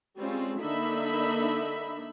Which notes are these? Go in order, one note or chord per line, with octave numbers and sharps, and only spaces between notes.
G3 G#3 C4 C#4 F4
D3 A#3 D4 D#4 E5 B5